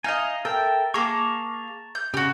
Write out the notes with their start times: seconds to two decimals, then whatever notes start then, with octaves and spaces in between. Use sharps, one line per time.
0.04 D#4 D#5 F5 G#5
0.45 A4 A#4 E5 G5
0.94 A#3 G#4 A5 A#5 C#6
1.95 G6
2.14 C#3 F#4 G4